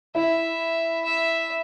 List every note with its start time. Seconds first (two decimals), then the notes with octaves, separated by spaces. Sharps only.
0.15 E4 E5
1.04 E5